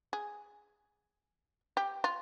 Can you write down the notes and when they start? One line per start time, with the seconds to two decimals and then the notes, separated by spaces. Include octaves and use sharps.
0.13 G#4
1.77 G4
2.04 F4